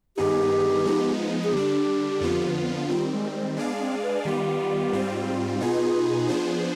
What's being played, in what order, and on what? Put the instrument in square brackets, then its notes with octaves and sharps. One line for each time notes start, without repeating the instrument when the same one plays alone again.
[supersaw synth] G2 D#3 B3 D#4 G#4 [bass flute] G4
[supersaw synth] F3 G#3 B3 D#4
[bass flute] G#4
[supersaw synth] D3 G3 D4 [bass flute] G4
[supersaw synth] F2 D3 F3 B3 F4
[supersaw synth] D#3 G3 C4 [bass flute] F4
[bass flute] G#3
G#3
[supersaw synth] G#3 D4 G#4 D5 F5 [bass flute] B3
[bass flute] C4
B4
[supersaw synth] D#3 G3 B3 F4 [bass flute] G4
[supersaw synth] G#2 G3 C4 F4
[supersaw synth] B2 B3 D#4 G#4 [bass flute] F4
[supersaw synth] F3 B3 D4 G#4 C5